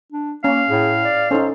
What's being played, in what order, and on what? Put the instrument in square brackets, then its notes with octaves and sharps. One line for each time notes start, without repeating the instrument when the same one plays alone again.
[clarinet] D4
[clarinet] A#3 [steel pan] C#4 [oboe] F5
[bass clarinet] A2 [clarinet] G#4
[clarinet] D5
[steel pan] C#4 D#4 [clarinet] A4 [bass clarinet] C5